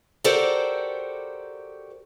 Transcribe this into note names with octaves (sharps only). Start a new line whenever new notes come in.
F#4 G4 A4 A#4 C5 D5